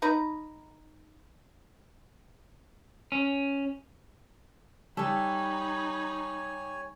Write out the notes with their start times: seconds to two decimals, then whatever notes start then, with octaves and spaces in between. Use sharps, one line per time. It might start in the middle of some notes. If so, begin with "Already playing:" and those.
0.02 D#4 B4 A#5
3.12 C#4
4.97 G3 D#4 A4 B4 C#5 G#5 B5